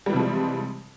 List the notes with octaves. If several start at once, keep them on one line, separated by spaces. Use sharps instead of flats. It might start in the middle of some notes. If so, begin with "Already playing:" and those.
C3 E3 F3 G3 G#3